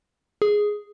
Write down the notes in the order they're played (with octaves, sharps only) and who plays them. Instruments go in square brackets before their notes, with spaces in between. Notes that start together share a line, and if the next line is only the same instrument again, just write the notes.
[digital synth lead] G#4